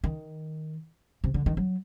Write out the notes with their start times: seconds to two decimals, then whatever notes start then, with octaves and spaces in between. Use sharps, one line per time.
0.04 D#3
1.24 C3
1.34 D3
1.46 D#3
1.57 F#3